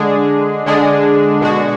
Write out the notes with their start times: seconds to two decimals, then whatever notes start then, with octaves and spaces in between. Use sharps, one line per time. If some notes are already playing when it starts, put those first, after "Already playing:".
Already playing: D3 G#3 D4 G#4
0.66 D3 G#3 D4 G#4
1.41 B2 G#3 D4 F#4